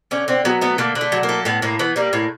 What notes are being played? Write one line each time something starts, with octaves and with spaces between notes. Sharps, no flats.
D3 C#4
D3 C4
F#3 B3
A3 B3
D3 A#3
D3
A3
F#3
A#3
A3
A2 B3
A2 A#3
E3 B3
G3 A#3
A2 A#3